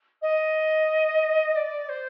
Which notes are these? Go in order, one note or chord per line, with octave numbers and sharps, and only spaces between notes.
D#5
D5
C5